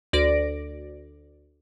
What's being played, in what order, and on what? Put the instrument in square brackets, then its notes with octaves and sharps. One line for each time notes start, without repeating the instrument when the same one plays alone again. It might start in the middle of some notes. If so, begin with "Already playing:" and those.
[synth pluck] D2 D5 A#6 D7